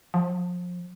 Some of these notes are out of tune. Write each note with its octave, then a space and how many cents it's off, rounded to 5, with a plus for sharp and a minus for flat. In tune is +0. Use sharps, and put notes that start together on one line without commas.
F3 +30